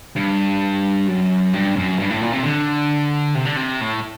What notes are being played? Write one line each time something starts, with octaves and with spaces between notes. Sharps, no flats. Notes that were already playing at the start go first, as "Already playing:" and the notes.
G2
F#2
G2
F#2
G2
A2
A#2
C3
D3
C3
D3
C3
A2